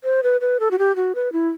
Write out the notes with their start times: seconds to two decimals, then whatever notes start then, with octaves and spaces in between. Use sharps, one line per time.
0.04 C5
0.23 B4
0.41 B4
0.60 A4
0.71 F#4
0.78 G4
0.96 F#4
1.15 B4
1.32 E4